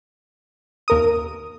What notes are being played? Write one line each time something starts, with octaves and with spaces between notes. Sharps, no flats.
D#2 A#4 D#6